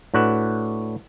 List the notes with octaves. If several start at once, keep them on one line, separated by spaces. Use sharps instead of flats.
A2 D4 F#4 B4